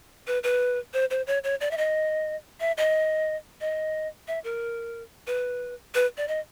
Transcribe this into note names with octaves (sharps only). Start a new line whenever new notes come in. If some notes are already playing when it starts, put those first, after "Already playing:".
B4
B4
C5
C5
C#5
C#5
D5
E5
D#5
E5
D#5
D#5
E5
A#4
B4
B4
D5
D#5